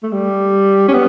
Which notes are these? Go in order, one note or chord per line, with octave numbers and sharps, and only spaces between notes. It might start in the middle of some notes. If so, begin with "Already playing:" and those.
A3
G3
C#4
B3